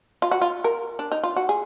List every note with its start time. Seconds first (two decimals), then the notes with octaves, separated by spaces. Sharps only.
0.22 F4
0.31 F#4
0.41 F4
0.64 A#4
0.99 D4
1.12 D#4
1.24 F4
1.37 F#4
1.49 G#4